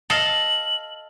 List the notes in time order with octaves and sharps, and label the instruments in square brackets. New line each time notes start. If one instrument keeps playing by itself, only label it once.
[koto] A4 D#5 F5 [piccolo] F#7